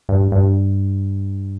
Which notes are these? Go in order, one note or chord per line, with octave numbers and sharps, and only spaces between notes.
G2
G2